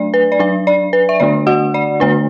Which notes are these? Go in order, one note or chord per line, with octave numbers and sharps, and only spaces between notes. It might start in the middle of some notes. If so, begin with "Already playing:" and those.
Already playing: F#3 A3 D4 D5
B4
D5
F#3 D4 B4
D5
B4
E5
D3 A3 D4 D5
F#4 F#5
D5
D3 A3 D4 B4